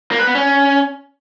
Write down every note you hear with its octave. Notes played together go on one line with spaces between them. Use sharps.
A#3
B4
B3
C#4